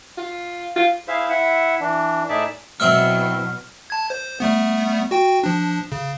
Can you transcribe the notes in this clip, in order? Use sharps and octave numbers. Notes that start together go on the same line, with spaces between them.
F4
F4
E4 G#4 C5 E5 F5
E4 E5 F#5
E3 D4
A2 D#4 G#4 D5 E5 A5
B2 F#3 C4 E4 C#6 F6
A5 G#6
C5
G3 A3 B3
F#4 G5
F3 D4
C#3